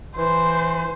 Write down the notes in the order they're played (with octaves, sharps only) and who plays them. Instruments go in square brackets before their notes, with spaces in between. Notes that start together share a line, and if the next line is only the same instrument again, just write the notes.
[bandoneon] E3 [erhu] C5